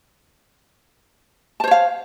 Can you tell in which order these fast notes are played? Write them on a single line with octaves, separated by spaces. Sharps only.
A5 C5 C#5 F5